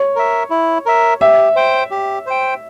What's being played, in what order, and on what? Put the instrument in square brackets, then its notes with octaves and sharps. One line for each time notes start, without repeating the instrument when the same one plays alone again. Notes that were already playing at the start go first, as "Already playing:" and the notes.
Already playing: [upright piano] C#5
[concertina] A#4 E5
E4
A#4 E5
[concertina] G4 [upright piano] E5
[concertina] C5 G5
G4
C5 G5